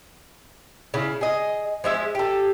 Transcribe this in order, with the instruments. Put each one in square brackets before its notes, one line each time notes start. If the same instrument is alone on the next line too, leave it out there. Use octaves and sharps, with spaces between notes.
[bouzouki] C#3 E4
G#4 D#5
F3 G#3 E5
G4 A4